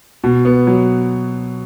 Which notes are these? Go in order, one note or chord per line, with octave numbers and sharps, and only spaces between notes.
B2
B3
F#3